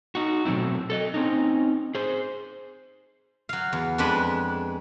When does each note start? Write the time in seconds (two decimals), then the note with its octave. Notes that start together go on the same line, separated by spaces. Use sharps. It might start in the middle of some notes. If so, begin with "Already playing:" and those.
0.15 D#4 F#4
0.45 B2 F#3 A3 C4 E4
0.90 A4 C#5 D#5
1.14 C4 C#4 D#4
1.95 G#4 C5
3.49 F#3 F5
3.73 E2
3.98 F2 G#3 D4 B4 B5